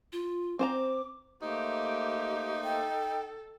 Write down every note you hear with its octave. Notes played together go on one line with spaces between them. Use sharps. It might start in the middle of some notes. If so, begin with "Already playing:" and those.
F4
C4 C5 A#5 D6
A3 A#3 D#4 G4 C5
A4 G5